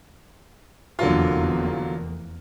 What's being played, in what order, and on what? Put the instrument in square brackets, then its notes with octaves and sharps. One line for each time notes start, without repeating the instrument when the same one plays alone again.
[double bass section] F1 E2 A#3 [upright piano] D3 F#3 F4